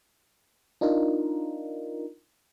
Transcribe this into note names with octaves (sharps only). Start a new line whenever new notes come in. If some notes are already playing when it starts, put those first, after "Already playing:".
D4 D#4 F4 A#4